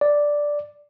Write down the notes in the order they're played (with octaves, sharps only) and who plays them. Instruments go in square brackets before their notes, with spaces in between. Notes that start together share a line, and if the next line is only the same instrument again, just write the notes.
[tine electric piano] D5